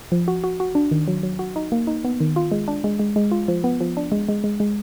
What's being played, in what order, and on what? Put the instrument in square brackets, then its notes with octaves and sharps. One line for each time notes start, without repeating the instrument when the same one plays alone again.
[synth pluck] F3
F#4
F#4
F#4
D4
D#3
F#3
F#3
F#4
D#4
A#3
D#4
B3
D#3
F4
G#3
D4
G#3
G#3
G#3
F4
F3
B3
F3
D4
G#3
G#3
G#3
G#3